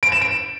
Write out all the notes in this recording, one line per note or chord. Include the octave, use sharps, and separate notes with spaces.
D7
E7
D7